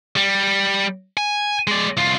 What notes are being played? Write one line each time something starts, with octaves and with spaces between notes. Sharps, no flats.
G3
G#5
G#3 D5
C2 F4